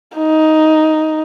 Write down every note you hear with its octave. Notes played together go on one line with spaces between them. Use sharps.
D#4